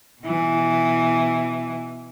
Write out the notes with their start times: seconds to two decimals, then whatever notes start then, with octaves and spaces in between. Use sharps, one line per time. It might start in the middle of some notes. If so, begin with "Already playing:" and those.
0.21 B2 E3